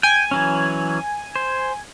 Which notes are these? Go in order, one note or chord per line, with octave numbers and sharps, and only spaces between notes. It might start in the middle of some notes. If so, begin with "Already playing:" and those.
G5 G#5
E3 F#3 C#4
C5